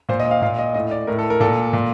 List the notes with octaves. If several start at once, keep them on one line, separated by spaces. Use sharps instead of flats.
A#2 C5
D#5
F5
A#2 F5
D#5
A2 D#5
D5
A2 A#4
A4
A#4
A#2 A4
A#2